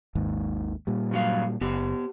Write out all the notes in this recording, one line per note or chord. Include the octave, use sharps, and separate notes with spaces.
G#1 D#2 G#2
A#2 G3
G2 F#3 F5
F#1 B3 G4